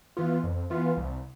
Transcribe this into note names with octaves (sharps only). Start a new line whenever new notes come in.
E3 B3 F4
F2
E3 B3 F4
C2